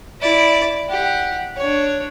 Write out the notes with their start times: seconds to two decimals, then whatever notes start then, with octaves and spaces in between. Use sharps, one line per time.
0.21 E4 D5
0.89 G4 F#5
1.57 D4 C#5